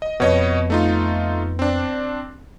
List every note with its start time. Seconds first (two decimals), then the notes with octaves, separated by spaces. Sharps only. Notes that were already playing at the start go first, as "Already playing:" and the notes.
0.02 D#5
0.20 F2 B2 B3 C#5 D#5
0.70 A3 D#4 F4
1.59 C4 D4